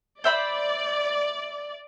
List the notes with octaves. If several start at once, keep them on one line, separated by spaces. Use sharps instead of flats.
C5 D5 E5 B5